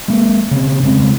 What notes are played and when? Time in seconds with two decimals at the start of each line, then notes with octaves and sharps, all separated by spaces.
0.08 G#3 A#3
0.51 C#3 C4
0.83 C#3 G#3 B3 C4